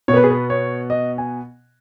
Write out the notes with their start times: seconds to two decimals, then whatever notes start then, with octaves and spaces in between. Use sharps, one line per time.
0.08 B2 C#5
0.13 B3 B4
0.24 G#4
0.30 B4
0.50 C#5
0.90 D#5
1.18 G#5